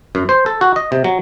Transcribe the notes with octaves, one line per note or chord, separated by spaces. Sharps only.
F#2
C5
A4
F#4
D#5
C3
F#3